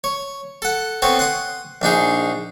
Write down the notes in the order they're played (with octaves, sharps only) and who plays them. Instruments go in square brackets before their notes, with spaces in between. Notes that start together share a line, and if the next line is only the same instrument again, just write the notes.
[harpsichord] C#5
A4 F#5
B3 C4 A4 C#5
F#5 C6 D#6
A#1 D4 D#4 G#4